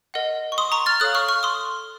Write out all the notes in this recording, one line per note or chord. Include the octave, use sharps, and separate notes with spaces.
A#4 D#5 F#5
C#6
C6 D#6
A#5 C#6
F6 A6
A4 C#5 F5 D#6 F#6
C#6 F6
C#6 F6
C6 D#6